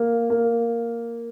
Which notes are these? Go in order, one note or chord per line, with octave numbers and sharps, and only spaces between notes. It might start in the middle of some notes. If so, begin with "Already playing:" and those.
Already playing: A#3
A#3